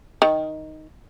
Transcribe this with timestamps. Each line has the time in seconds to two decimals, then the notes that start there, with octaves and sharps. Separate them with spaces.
0.22 D#3